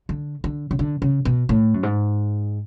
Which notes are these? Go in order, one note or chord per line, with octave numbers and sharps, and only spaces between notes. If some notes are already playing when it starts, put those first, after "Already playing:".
D3
D3
C#3
D3
C#3
B2
A2
F#2
G#2